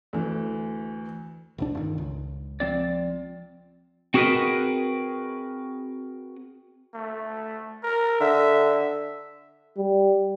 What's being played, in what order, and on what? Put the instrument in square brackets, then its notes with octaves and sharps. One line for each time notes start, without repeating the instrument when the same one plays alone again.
[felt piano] D2 E3
[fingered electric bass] E1 D2 D4
G1 D#3
C#2
[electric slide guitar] F3 C4 D5
[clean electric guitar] C4 F#4 G#4 A#4 B4 D#5
[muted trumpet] A3
A#4
[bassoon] D3 [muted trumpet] E5
[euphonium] G3